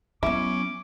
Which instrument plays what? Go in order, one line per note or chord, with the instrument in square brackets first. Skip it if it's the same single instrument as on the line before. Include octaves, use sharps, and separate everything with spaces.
[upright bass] F#3 B3 [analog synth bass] C#4 [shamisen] E4 [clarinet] D6